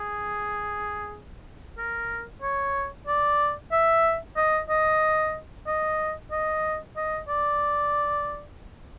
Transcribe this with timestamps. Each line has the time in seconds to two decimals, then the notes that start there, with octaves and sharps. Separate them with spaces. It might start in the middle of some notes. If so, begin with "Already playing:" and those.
Already playing: G#4
1.78 A#4
2.42 C#5
3.07 D5
3.72 E5
4.37 D#5
4.69 D#5
5.67 D#5
6.32 D#5
6.96 D#5
7.28 D5